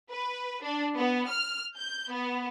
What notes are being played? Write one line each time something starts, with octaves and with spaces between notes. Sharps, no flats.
B4
D4
B3
F6
G6
B3